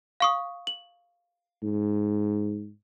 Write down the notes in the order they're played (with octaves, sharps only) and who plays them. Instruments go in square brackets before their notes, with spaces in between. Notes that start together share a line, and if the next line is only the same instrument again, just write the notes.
[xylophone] F5 C#6 D#6
F#7
[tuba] G#2